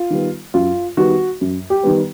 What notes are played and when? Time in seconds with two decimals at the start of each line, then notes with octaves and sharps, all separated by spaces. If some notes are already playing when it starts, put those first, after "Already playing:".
Already playing: F4
0.10 D#3 G3 B3
0.54 F#2 F4
0.97 D#3 G3 B3 F#4
1.41 F#2
1.70 G4
1.83 D#3 G3 B3